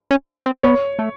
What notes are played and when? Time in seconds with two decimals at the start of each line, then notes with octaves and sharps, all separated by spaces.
0.11 C#4
0.46 C4
0.63 B3 C#5
0.99 A3